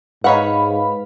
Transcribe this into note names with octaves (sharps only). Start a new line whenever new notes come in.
G#2 D#4 B4 C#5 F5 F#5 B5